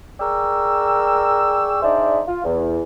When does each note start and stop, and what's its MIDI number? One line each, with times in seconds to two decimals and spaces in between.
0.20 1.78 68
0.20 1.78 70
0.20 1.78 74
0.20 1.78 79
0.20 1.78 85
0.20 1.78 88
1.82 2.22 62
1.82 2.22 63
1.82 2.22 68
1.82 2.22 72
1.82 2.22 74
1.82 2.22 76
2.28 2.44 65
2.44 2.83 40